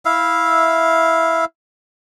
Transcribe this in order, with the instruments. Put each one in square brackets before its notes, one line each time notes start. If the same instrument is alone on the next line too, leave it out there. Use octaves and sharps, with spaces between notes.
[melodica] E4 E5 F5